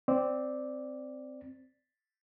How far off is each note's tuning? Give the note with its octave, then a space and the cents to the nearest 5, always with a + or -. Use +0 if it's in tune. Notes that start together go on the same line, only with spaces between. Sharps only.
C4 -5 D5 +0